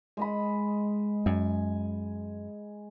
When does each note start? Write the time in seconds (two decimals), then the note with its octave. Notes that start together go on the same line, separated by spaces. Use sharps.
0.17 G#3 D#5 B5
1.26 F#2 G#5